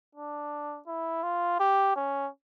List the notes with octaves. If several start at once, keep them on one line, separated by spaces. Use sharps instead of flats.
D4
E4
F4
G4
C#4